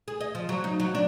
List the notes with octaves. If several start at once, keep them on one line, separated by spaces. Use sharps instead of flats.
G#4
D#5
F3
F#3
D#4
F#3
D4